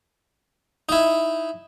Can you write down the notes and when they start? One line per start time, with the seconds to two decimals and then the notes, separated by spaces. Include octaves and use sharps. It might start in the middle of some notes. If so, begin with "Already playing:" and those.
0.89 D#4 E4